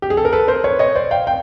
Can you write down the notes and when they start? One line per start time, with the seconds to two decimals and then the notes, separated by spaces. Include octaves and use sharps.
0.02 G4
0.10 G#4
0.17 A4
0.25 A#4
0.33 A4 B4
0.48 A#4 C5
0.64 B4 C#5
0.79 C#5 D#5
0.95 C5 D5
1.11 F5 G5
1.27 G5